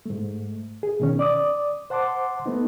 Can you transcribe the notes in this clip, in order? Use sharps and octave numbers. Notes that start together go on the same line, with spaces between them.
G#2 A3
G#4
B2 D#3 C#4
D5 D6 D#6
C5 F#5 A5 C6 D6
A3 B3 D#4